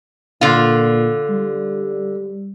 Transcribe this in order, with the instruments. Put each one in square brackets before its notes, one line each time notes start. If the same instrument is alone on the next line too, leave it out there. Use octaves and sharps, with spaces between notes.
[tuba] A#2 [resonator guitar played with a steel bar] D3 F4
[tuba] G3